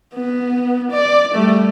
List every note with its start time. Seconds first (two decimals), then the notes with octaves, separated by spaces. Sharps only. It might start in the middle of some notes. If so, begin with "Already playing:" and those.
0.14 B3
0.91 D5
1.34 G3 A3